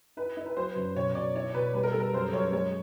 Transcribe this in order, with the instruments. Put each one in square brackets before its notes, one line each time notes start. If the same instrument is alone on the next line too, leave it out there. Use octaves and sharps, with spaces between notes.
[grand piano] E4 [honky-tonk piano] B4
[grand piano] E4
[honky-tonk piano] B4
[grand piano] F#3 [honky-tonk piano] C5
[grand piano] F#2
[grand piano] B2 [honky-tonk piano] C#5
[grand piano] B2 [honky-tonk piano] D5
[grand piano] E4 [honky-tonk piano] C#5
[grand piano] B2 [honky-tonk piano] B4
[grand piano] G3 [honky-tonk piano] B4
[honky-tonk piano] A#4
[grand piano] G3 [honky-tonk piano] A4
[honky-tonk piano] A#4
[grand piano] F#2 [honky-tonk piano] C5
[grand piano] F#2 [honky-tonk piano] C#5
[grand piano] G#3 [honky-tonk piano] C#5